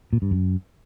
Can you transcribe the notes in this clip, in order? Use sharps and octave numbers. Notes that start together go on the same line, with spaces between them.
A#2
G2
F#2